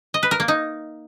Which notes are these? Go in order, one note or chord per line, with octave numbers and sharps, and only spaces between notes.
D#5
B4
A#4
A#3
D#4